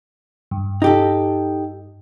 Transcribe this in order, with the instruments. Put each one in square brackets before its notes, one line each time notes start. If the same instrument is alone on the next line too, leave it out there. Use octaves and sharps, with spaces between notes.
[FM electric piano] G2
[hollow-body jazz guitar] D#4 G4 A4